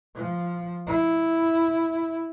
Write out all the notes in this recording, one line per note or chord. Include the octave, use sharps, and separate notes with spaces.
F3
E4